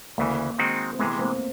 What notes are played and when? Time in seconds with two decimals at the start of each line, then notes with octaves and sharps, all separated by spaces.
0.18 D2 C#3 E3 A#3
0.58 D#3 G#3 C4 D#4 F#4
0.93 C4
0.99 C3 E3 G#3 A3 B3
1.19 A#3 C4